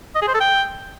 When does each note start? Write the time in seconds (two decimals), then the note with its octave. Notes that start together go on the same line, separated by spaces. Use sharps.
0.15 D#5
0.22 G#4
0.28 C5
0.34 A4
0.40 G5